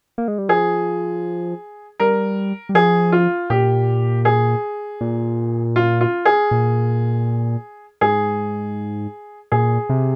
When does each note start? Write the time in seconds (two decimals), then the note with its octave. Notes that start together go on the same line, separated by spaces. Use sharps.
0.18 A#3
0.28 G#3
0.38 G3
0.49 F3 G#4
2.00 G3 A#4
2.69 G3
2.74 F3 G#4
3.12 F4
3.50 A#2 G4
4.25 G#4
5.01 A#2
5.76 F4
6.01 F4
6.25 G#4
6.51 A#2
8.01 G#2 G#4
9.52 A#2 G#4
9.89 C3